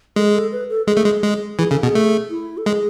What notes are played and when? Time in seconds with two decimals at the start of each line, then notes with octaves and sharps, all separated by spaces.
0.16 G#3 A4
0.26 G#4
0.35 A4
0.52 B4
0.70 A4
0.87 G#3 G#4
0.97 A3
1.05 G#3
1.23 G#3
1.59 E3 G#4
1.71 C#3 A4
1.82 B2 G#4
1.95 A3
2.30 E4
2.57 A4
2.66 G#3 G#4